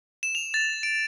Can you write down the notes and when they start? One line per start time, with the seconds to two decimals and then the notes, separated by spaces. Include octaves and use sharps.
0.23 E7
0.35 F7
0.54 A6
0.83 D7